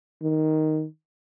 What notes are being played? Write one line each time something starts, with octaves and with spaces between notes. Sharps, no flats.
D#3